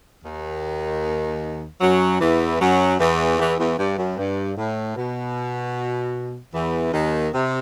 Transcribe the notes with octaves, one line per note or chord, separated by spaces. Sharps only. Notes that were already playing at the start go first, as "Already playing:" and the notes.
D#2 D#3
F#2 F#3
E2 E3
F#2 F#3
E2 E3
E2 E3
E2 E3
G2
F#2
G2
A2
B2
E2 E3
D#2 D#3
C3